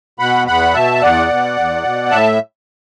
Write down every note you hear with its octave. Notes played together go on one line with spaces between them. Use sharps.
B2 F#5 B5
E2 F#5 B5
B2 E5 A5
E2 D5 F#5
B2
E2
B2
A2 E5 A5